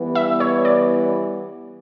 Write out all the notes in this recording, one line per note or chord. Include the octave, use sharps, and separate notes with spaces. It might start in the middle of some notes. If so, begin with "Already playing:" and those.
Already playing: E3 G3 B3
E5
C#5
D5